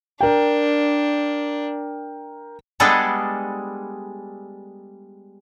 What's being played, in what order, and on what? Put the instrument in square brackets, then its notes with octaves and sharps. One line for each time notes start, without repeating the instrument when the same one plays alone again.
[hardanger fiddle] D4 [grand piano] A#4 G5
[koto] G3 G#3 B3 D4 G#4 A4